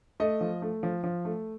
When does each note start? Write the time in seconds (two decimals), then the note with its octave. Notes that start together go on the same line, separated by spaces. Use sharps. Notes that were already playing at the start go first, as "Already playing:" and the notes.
0.20 A3 D#5
0.41 F3
0.62 A3
0.83 F3
1.04 F3
1.25 A3